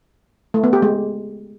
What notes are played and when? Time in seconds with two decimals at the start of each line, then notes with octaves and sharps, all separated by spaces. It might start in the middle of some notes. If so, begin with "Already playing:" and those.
0.54 A3
0.64 B3
0.73 G4
0.82 G#3